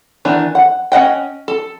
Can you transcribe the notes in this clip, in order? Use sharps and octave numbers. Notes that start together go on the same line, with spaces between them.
D#3 E3 B3 D4
F#5
C#4 D#5 F#5 G5
A4